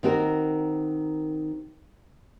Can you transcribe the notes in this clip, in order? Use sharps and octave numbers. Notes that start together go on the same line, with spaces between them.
D#3 C4 F#4 A#4